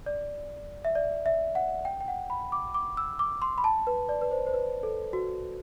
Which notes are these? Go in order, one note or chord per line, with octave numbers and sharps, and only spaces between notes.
D5
E5
D5
E5
F#5
G5
G5
F#5
B5
D6
D6
E6
D6
C6
B5
A5
B4
D5
B4
C5
C5
B4
A4
F#4